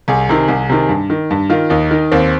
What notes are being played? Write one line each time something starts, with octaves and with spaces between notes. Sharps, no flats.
C2 G#4
C3 D#3
C2
C3 D#3
G2
D#3
G2
D#3 F4
D#2 D#4
D#3
D#2 C4